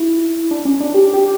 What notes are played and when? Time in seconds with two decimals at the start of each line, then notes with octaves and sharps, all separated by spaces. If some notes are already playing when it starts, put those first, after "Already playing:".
Already playing: E4
0.51 D4
0.65 C#4
0.80 D4
0.94 G4
1.14 G4